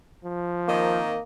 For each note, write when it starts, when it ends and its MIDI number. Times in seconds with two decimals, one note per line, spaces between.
0.24 1.00 53
0.68 1.17 51
0.68 1.21 58
0.68 1.17 60
0.68 1.17 75